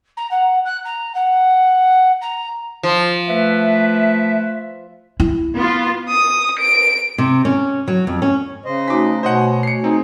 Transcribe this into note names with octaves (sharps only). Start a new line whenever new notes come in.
A#5
F#5
F#6
A#5
F#5
A#5
F3
A3 B4 E5
E4
B3 F4
D#6
D7
C3
C#4
F#3
F2
C#4
C#3 C5 D#5
A3 D#4 F#4 G#5 D6 B6
B2 C5 C#5 D#5 F#5
C7 C#7
C4 D#4 G#4